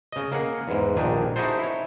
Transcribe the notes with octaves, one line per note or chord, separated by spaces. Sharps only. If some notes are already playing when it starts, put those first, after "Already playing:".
C#3 D#5
A#3 G#4 F#5
E2 G#2
A#1 D#3 D4 G#5
D#4 E4 F#4 G#4 A4 C5
E4 C#5